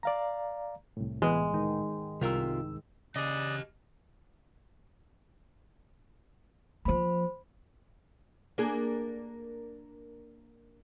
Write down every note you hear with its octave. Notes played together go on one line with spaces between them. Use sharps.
D5 F5 A#5
C2 A2
E3 G#3 B3
G#2 D#3
C2 C3 F4 A#4 E6
C#3 G4 D5 D#5 D#6 F#6
F3 A#3 C5 B5
A#3 D4 G#4